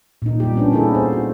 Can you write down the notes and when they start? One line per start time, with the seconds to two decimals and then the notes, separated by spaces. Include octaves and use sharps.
0.22 A#2 D#4
0.40 G3 G4
0.55 B3 C#4 D4
0.72 G3 A#3 D#4 E4 G#4 A4
0.95 C5
1.13 F#4